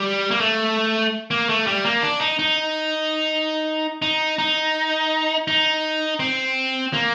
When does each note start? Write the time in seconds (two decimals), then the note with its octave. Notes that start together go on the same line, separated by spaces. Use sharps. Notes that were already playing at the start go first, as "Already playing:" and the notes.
Already playing: G3
0.31 A#3
0.40 A3
1.31 A#3
1.49 A3
1.67 G3
1.85 A#3
2.02 D4
2.21 D#4
2.39 D#4
4.02 D#4
4.39 D#4
5.48 D#4
6.20 C4
6.93 A#3